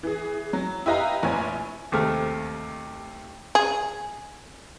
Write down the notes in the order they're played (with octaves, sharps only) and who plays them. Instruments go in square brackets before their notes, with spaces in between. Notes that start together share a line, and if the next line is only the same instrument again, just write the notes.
[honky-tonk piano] E3 G#4
F#3
E4 G4 B4 D#5 F5 A#5
F1 A#1 E4 C#5 G#5
[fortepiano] D#2 C3 A3 F6
[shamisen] G#4